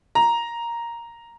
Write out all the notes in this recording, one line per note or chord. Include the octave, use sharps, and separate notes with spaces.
A#5